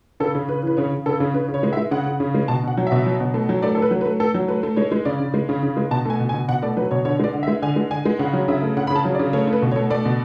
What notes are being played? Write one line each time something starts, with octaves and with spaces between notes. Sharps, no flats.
C#3 A4
C#3
C#3 B4
E3 B4
C#3 C#5
C#3
C#3 A4
C#3
C#3 B4
C#3
C#5
G#3
E5
G#3
C#3 F#5
C#3
C#3
G#3
B2 A5
B2 F#5
F#3
B2 E5
F#3
B2
A3
F#3
A3 D5
A4
A3 B4
F#3
B4
A3
A3 A4
F#3
A3 B4
A3
G#3 C#5
G#3
C#3 D5
C#3
G#3
C#3
C#3
G#3
B2 A5
A3 G#5
B2
G#5
B2
B2 F#5
A3 D5
F#3 B4
B2 C#5
D3 C#5
G#3 D5
D3
E5
G#3
D3 G#5
G#3
D3 G#5
G#3
C#3 F#5
F#3
C#3 E5
A3
C#3 F#5
B5
C#3
A5
F#3
D5
C#3
A3 C#5
A3
B4
B2
C#5
A3
A3 D5
B2